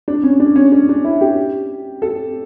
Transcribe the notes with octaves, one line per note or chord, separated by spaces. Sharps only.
D4
C#4
D4
C#4
D4
D4
E4
G4
A4